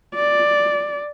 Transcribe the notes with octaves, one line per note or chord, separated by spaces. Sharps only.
D5